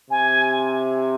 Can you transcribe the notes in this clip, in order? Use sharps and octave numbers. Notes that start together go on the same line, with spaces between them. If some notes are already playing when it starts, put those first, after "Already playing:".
C3 G#5